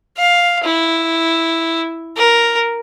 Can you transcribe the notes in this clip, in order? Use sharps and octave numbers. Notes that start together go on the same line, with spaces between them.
F5
E4
A#4